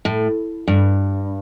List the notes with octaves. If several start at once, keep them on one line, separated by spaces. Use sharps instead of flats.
A2
G2